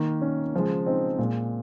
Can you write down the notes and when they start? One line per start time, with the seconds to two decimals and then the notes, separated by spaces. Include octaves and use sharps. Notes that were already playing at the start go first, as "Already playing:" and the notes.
Already playing: D#3 A#3
0.22 C#4
0.54 C#3 F3 G#3
0.86 C4 D#4
1.18 A#2 G#3